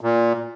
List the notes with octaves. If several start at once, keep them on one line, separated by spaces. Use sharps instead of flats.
A#2